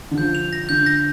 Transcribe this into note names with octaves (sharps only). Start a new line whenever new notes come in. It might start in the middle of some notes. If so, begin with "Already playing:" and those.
D3
F3 G6
F7
A#6
D3 G6
A#6